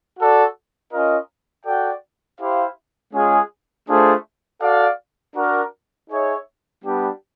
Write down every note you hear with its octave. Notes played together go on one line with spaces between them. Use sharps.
F#4 A4 D5
C#4 F4 A#4 D#5
F#4 A4 D5 G5
E4 G4 C5 F5
G#3 C#4 F4 G#4
A3 D4 F4 G#4 C5
F#4 A4 D5 F5
D4 F#4 A#4
D#4 G#4 C#5 E5
G3 B3 D4 G4